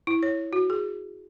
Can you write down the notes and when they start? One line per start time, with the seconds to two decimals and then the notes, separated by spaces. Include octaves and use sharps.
0.07 E4
0.23 C#5
0.53 F#4
0.70 G#4